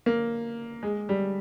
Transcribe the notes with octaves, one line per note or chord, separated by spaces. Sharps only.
A#3
G#3
G3